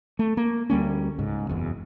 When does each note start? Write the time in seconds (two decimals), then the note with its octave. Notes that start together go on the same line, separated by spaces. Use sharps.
0.19 A3
0.37 A#3
0.70 D2 G3 A#3 C#4
1.18 C#2 G#2
1.49 F#1 E2